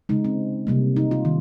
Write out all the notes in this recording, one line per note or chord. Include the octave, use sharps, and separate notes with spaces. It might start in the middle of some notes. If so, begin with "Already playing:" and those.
C#3 G#3 D#4
C4
C3 G3 A#3
D#4
F4
D#3